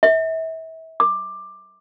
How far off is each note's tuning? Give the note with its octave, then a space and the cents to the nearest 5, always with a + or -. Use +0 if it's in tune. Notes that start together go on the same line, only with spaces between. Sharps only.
E5 -35
D6 +15